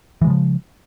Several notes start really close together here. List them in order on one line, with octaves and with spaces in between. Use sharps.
E3 G#3 C#3 F3